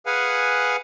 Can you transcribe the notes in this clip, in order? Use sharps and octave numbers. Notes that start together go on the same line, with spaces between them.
G#4 B4 F5 F#5 G#5